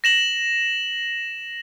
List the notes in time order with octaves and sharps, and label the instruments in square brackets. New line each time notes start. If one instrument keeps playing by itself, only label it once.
[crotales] A#6 E7 F#7